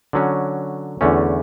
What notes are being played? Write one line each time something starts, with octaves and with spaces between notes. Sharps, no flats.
D3 F#3 C#4
E2 D3 A3 C#4